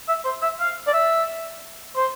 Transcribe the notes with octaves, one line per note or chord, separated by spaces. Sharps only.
E5
C5
E5
F5
D5
E5
C5